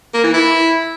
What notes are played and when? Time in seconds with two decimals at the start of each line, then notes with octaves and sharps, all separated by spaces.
0.14 A#3
0.24 E3
0.34 E4